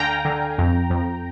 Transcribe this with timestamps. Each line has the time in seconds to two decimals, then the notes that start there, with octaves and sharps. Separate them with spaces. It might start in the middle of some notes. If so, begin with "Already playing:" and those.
Already playing: D2 D3 F5 G5 G#5 A#5
0.25 D3
0.58 F2
0.90 F2